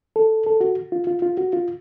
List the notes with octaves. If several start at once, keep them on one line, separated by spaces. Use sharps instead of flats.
A4
A4
F#4
F4
F4
F4
F#4
F4